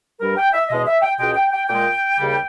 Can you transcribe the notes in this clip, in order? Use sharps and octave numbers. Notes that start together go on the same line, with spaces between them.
G2 G3 A#4
G5
E5
E2 B2 G#3 D#5
E5
G5
C#2 B2 G#3 G5
G5
G5
A#2 G#3 G5
D#2 C#3 G3